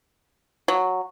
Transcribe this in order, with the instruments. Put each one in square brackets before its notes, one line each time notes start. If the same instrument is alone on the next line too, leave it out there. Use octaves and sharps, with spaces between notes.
[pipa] F#3